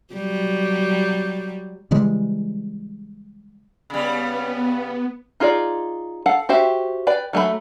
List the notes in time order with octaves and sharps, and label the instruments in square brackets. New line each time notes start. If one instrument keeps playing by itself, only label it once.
[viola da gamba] F#3 G3
[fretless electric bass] C#3 E3 G3 G#3
[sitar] C#3 G3 [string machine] B3
[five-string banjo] D#4 F4 G#4 C5 D5
A4 F5 F#5
F#4 G4 C5 E5
B4 D5 G5
F#3 A3 A4 B5